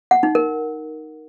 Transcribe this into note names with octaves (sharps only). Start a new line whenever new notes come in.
F#5
D#4
A#4